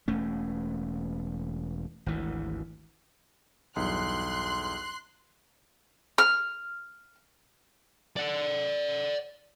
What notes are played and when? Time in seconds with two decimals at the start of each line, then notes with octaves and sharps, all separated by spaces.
0.08 E1 A3 C#4
2.06 G#1 D2 E3
3.76 B1 E2 G2 C6 F#6
6.18 F6
8.16 D5 F#5